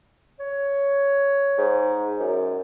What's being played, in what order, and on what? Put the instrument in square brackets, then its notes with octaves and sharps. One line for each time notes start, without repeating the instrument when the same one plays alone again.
[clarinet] C#5
[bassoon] G#2
F#2